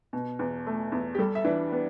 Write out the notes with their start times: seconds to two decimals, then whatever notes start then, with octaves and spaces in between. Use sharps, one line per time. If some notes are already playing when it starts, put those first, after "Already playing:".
0.13 B2
0.39 E2
0.67 A3
0.92 E2
1.15 G4
1.18 G3 A4
1.35 E5
1.45 E3 D4 D5
1.72 B3